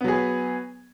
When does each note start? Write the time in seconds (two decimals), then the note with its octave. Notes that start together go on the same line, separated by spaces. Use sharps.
0.01 B3
0.04 F#3
0.08 G#4
0.12 B4